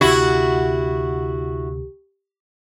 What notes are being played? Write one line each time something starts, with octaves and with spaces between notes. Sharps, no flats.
D2 C3 E4 F#4 G4